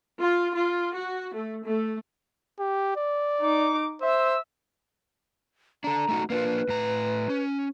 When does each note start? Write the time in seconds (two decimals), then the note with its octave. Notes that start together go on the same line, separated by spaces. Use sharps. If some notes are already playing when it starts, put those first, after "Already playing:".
0.19 F4
0.54 F4
0.92 F#4
1.33 A3
1.64 A3
2.59 G4
2.96 D5
3.41 D#4 D6
4.02 C5 E5 E6
5.84 D4 A4 A#5
6.09 A3 D#4 F#4
6.30 A#3 D4 F4 B4
6.69 A2 A#5
7.30 C#4